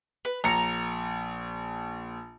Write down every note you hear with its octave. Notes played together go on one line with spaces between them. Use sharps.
B4
A#1 A#5 C#7